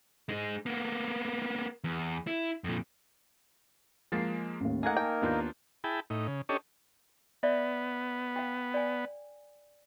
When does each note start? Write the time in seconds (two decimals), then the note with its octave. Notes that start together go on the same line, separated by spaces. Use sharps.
0.29 G#3 D#4
0.66 A#3 B3
1.84 E2
2.27 E4
2.64 F2 A#2
4.12 F3 G#3 A#3 A6 C7
4.60 A1 D#2
4.83 A3 A#3 D#4 G#4 A#4 F#5 G#5 G#6
4.97 G5 A5
5.22 D#2 B3 D4 F4 A#5 G6
5.84 E4 G#4 G5 A5 B5
6.10 A2 D#4
6.27 C#3
6.49 C#4 D4 G4 A4 C#5 D#5
7.43 B3 D5 E5
8.36 F5 G5
8.74 D5 G#5